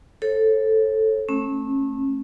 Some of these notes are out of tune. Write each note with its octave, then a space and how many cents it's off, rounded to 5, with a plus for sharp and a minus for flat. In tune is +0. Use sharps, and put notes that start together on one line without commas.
A4 +0 C#5 -45
A3 +0 C#4 -30